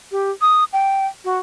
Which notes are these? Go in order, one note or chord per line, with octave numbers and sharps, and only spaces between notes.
G4
D#6
G5
F#4